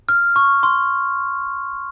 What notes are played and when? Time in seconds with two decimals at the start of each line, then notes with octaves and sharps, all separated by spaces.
0.09 F6
0.36 C#6
0.63 C6